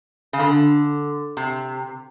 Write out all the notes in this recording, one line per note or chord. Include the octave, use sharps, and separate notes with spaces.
C#3
D3
C3